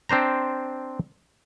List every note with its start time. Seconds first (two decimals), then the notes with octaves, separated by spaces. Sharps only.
0.09 C4 D4 C5 A#5